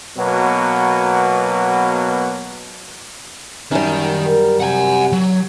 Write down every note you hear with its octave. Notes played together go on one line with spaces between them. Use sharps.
B2 F#3 A#3 B3
F#2 D#3 G3
A#4
C3 F#5 G#5
F#3